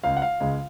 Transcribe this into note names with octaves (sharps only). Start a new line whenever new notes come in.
C#2 C#3 G#3 F5
F#5
F5
C#2 C#3 G#3